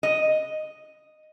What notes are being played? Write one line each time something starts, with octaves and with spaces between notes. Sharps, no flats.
D#5